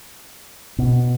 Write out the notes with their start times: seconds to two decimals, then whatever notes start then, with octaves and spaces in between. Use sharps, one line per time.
0.78 B2